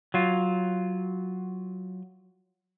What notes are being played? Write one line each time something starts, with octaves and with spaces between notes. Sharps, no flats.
F#3 F4